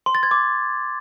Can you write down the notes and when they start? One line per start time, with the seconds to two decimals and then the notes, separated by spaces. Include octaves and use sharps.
0.06 C6
0.15 A6
0.23 G#6
0.31 D6